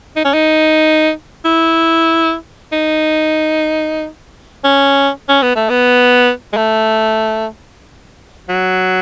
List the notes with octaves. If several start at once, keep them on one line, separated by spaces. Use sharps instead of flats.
D#4
C#4
D#4
E4
D#4
C#4
C#4
B3
A3
B3
G#3
A3
F#3